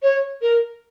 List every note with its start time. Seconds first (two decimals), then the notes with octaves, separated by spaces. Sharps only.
0.03 C#5
0.42 A#4